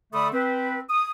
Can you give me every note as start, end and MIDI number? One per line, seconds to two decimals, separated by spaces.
0.13 0.28 50
0.13 0.28 57
0.13 0.28 69
0.13 0.28 74
0.13 0.28 83
0.13 0.28 87
0.32 0.79 60
0.32 0.79 71
0.89 1.10 87